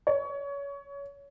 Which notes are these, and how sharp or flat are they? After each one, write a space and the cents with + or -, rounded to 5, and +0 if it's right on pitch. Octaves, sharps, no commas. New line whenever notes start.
C#5 +20